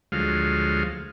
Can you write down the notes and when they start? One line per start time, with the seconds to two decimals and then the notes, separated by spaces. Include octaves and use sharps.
0.12 D2 F3 F#3 G#3 F5